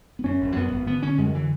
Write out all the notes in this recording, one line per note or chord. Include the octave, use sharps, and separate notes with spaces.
B3
F#2 C#4
G#1
F#2 B3
G#1
D3 B3
D3 C#4
F#2 G#3
D3 E3